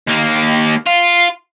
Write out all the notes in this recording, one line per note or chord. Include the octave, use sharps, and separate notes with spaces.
D#2 A#3
F4